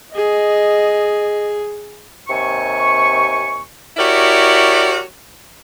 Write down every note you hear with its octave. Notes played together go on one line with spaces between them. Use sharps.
G#4 D#5
D#2 C3 G#5 C#6
E4 F#4 G4 A#4 C#5 D5